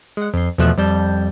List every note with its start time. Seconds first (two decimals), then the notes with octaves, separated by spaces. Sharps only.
0.17 G#3 F#5
0.34 F2 C6
0.58 E2 B2 F3 A3 F#6 E7
0.78 F2 G3 A5 G6